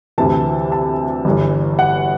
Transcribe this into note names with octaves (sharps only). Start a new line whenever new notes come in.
D2 C3 E3 A5
A5
G1 G2 E3
F#5